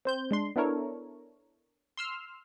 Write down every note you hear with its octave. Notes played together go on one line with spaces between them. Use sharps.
C4 C5 G6
G#3 D4 C6
B3 D4 E4 A4 A#4 C#5
C6 E6 F6